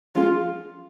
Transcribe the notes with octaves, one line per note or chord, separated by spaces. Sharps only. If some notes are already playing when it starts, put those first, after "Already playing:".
F3 G#3 C#4 F4 G#4